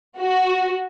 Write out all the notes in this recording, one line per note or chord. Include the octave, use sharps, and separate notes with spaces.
F#4